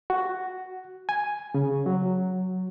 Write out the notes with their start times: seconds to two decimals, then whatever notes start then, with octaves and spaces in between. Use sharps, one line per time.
0.10 F#4
1.09 G#5
1.54 C#3
1.86 F#3